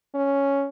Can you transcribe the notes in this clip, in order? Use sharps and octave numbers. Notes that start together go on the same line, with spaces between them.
C#4